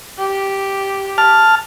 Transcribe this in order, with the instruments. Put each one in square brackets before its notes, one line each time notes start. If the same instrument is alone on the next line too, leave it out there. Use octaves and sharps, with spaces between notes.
[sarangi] G4
[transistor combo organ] A5 F6